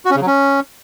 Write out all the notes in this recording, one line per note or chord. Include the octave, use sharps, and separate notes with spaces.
F#4
C#4
C#3
F#3
C#4